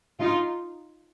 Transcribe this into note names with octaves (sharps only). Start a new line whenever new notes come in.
D#4 F4